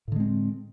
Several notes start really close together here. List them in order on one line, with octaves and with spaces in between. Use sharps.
A2 D3 G#3 C4